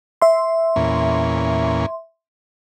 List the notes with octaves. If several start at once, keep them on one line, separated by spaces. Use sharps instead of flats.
E5 C6
E2 A#2 C#4